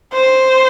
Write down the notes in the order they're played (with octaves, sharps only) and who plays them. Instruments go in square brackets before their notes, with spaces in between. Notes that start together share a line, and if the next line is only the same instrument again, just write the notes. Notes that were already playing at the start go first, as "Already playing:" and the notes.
[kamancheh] C5